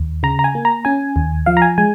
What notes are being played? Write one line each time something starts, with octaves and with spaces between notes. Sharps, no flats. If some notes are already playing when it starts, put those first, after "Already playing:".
Already playing: D#2
C#3 A#5
A#5
G#5
A#3
A#5
C#4 G#5
D#2
F3 F5
A#5
G#5
G#3 G#5